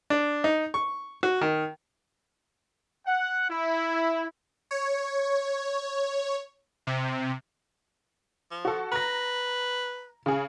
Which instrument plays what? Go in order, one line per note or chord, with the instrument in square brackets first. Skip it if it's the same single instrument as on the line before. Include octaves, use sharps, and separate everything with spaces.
[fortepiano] D4
D#4
C#6
F#4
D#3
[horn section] F#5
E4
[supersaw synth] C#5
C3
[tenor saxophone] F3
[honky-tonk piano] F#4 A4
[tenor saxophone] B4 [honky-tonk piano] A#5 A#6
[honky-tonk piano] C#3 G#4